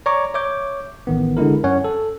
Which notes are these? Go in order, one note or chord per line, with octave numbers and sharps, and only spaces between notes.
C#5 D5 A#5 C#6 D6
C#5 E5 D6 G6
A1 D#3 B3
D3 G#3 E4 A#4
F#2 C#4 C#5 F#5
A4